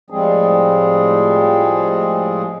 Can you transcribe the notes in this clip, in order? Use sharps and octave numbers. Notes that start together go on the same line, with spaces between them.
A2 F3 G3 G#3 C4 G#4